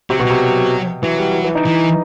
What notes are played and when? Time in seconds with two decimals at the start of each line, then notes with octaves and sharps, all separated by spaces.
0.10 C3 F#3
0.20 B2
0.25 C3 F#3
1.03 E3 F#3
1.19 G3
1.34 E3
1.44 E3
1.55 D#4
1.66 E3